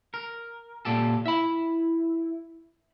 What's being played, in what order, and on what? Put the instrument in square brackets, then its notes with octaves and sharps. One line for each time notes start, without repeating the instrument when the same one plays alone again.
[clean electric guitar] A#4
A#2 G4 A4
[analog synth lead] E4 [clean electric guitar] E5 B5